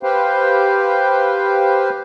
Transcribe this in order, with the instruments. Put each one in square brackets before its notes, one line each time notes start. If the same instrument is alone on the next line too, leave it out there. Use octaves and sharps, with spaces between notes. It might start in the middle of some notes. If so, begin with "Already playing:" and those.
[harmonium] G4 B4 C5 F5 G5